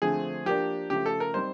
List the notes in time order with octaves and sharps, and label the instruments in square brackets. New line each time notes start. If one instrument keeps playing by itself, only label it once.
[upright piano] D3 F3 A3 C4 [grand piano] G#4
[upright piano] F3 A#3 D4 [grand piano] G4
[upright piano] C#3 F3 A3 [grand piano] G4
[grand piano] A4
A#4
[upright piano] G3 C4 D#4 [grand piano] C5